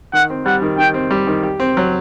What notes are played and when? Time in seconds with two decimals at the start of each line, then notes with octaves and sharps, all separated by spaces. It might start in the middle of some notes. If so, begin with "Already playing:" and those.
0.13 D#3 F#5
0.30 C4
0.46 G3 F#5
0.62 D#3
0.78 D#3 G5
0.94 C4
1.11 G3
1.27 D#3
1.43 G4
1.60 C4
1.77 F#3